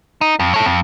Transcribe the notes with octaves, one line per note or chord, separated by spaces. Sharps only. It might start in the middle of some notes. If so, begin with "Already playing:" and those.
D#4
F2
A4 C#5
F2